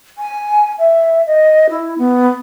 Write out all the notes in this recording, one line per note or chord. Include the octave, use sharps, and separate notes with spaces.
G#5
E5
D#5
E4
B3